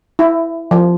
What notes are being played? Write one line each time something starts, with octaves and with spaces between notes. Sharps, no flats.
E4
F3